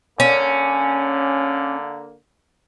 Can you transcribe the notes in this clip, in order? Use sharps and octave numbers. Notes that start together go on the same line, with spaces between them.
D3 A#3 C#4